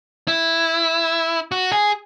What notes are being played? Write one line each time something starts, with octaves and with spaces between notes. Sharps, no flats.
E4
F#4
G#4